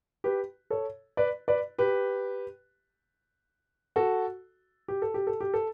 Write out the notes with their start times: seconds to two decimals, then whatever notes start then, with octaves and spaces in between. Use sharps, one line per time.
0.24 G4 B4
0.70 A4 C#5
1.17 B4 D5
1.48 B4 D5
1.78 G4 B4
3.96 F#4 A4
4.88 G4
5.02 A4
5.14 G4
5.27 A4
5.41 G4
5.54 A4